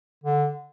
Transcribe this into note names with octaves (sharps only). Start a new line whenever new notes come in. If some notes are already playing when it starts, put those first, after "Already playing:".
D3